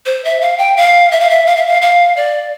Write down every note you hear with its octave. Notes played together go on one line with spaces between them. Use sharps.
C5
E5
F5
G5
F5
E5
F5
E5
F5
E5
F5
F5
D5